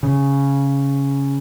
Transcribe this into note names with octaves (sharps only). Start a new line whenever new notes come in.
C#3